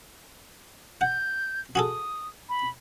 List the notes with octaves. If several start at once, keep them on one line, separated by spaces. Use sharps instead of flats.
F#5 G6
F#4 G#4 A4 D#6
B5